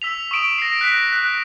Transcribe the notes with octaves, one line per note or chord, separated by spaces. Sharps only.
E6 B6 F7
C#6 D#6 D7 E7
A#6 C7
F#6 B6
F#6